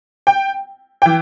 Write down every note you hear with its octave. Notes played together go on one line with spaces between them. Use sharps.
G5
E3 G5